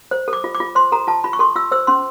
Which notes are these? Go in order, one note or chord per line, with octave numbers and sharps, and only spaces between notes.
C5
A4
D6
F4
D6
F4
C5 C6
A4 A#5
F4 A5
F4 B5
C#6
A4 C6
F4 E6
C5 E6
C#4 C6